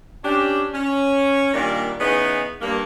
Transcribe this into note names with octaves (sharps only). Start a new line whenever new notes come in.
C#4 D4 G4
C#4
A#2 D#3 G3 A#3 D4 D5
E3 B3 C#4 D#4 G#4 B4
G2 A#3